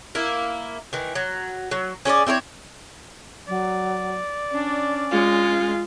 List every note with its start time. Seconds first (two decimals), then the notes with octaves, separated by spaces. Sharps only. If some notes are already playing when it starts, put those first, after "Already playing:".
0.15 A#3 E4
0.93 D#3 E3
1.15 F#3
1.71 F#3
2.05 C#4 G#4 C#5 D5
2.27 C4 E4 G#4 C#5
3.48 F#3 D5
4.51 C#4 D4
5.11 G#3 F4